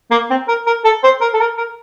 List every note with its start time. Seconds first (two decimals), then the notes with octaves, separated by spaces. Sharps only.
0.11 A#3
0.30 C4
0.48 A#4
0.67 A#4
0.85 A4
1.04 C5
1.21 A#4
1.34 A4
1.40 A#4
1.58 A#4